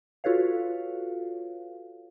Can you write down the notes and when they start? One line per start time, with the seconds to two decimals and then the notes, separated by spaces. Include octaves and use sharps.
0.24 F4 F#4 A4 B4 C#5 F5